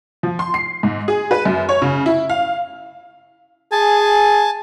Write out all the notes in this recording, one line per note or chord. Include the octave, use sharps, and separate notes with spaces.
F3
C6
C7
G#2
G#4
B4
F#2
C#5
C#3
E4
F5
G#4 G#5 A5